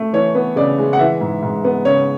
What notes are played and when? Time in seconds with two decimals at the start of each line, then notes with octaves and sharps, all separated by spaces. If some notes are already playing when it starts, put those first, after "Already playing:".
Already playing: A3
0.13 E3 C#5
0.35 B3
0.56 C#3 D5
0.78 G#3
0.93 F#5
0.99 E3 E5
1.21 G#2
1.43 G#2
1.64 B3
1.85 C#3 C#5